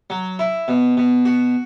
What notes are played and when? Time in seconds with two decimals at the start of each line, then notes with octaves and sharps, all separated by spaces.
0.10 F#3
0.39 E4
0.68 B2
0.97 B2
1.25 F#4